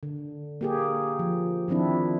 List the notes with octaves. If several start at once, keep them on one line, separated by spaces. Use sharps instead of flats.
D3
A#3 G4 G#4
F3
D#3 F3 C4 D4 E4